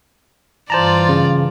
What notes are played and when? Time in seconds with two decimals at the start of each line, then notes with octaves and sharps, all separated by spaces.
0.70 G2 E3 F4 C5 D5 A5 A#5
1.09 C#3